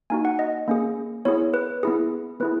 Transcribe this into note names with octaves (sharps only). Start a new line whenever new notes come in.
A#3 D#4 F#4 G#5
F#5
D#5
A#3 C#4 G#4
B3 E4 G#4 C#5
B4
B3 E4 G#4
B3 E4 G#4 B4